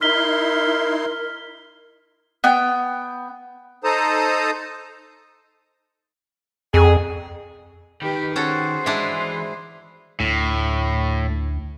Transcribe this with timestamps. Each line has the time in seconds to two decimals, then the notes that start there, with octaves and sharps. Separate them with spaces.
0.01 D#4 E4 A#4 C6 F6 B6 G7
2.44 B3 G5
3.84 D#4 A4 C5 A5 A#5 D#6
6.74 F2 G#4
8.02 D#3 G4 B4
8.36 C#4 F#4 G#4 A4 C5
8.86 E3 G#3 D4 E4 E5
10.20 D2 A2